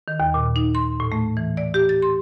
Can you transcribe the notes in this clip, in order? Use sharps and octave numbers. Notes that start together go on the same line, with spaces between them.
D#3
D#2
A#2
D#4
C6
A2
A3
E3
D5
G4
A6
C6